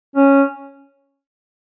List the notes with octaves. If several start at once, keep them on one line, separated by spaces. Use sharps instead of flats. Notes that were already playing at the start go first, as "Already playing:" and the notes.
C#4